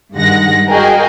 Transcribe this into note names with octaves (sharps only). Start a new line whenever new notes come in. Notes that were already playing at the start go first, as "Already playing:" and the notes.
G2 D#3 G#3 F#5 A#6
F#4 G#4 A#4 D#5 F5 G5